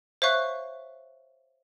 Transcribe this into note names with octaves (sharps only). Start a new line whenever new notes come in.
C5 C#5 E5 F5 C#6 F#6